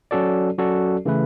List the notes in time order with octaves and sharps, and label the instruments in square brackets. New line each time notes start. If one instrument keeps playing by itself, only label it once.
[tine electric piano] F#3 C#4 F#4 A4 D5
F#3 C#4 F#4 A4 D5
C#3 E3 A3 E4 B4